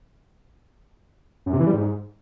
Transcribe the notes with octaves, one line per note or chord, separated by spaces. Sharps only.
F#2
C3
E3
G3
G#2